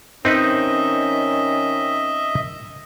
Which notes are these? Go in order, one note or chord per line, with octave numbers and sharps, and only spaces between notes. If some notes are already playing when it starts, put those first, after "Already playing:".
D#3 C4 C#4 D#4 B4 D#5 E5